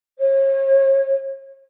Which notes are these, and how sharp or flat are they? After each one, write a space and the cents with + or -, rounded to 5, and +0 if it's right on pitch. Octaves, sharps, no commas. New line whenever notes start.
C#5 -35